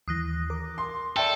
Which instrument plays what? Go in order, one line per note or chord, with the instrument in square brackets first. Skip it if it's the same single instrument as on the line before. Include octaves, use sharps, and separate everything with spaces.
[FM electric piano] D#2 E3 [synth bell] D#6 F#6 A#6
[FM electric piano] A#4 D6
[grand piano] C6
[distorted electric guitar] A4 [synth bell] D5 E5 A5 [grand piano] G5